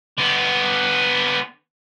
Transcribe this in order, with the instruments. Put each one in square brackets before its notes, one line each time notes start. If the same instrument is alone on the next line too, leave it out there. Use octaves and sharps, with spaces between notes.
[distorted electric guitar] D3 B3